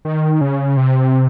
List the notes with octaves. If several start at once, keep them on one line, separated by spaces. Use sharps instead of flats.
D#3
C#3
C3